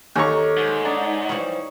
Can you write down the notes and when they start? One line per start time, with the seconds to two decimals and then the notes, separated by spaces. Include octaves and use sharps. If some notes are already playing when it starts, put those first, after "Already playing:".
0.16 D#2 A4 C#5 A#5 C#6
0.57 G#2
0.85 D4 D#4
1.29 E3 F3 G3 C#6